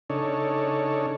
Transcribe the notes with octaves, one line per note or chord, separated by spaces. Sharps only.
C#3 D4 D#4 A4 C#5